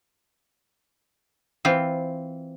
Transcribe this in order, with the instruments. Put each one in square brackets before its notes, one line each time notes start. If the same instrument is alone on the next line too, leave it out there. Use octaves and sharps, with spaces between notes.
[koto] E3 C4 F4